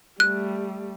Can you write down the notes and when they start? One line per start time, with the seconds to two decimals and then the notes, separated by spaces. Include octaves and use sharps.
0.20 G3 A3 F#6